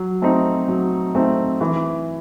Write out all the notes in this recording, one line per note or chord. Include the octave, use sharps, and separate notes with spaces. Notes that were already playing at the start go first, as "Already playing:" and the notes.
Already playing: F#3
A3 C4 D#4
F#3
A3 C4 D#4
E3